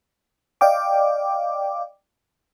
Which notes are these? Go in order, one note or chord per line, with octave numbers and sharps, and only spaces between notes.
D5 D#5 F5 G5 D6